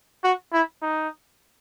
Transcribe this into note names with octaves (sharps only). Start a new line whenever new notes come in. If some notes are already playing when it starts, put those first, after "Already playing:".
F#4
E4
D#4